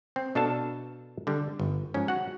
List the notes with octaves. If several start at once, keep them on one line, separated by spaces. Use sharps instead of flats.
C4
B2 D4 A4 F5 A5
D3 G3
G1
G#2 F3 C#4
F#4 F#5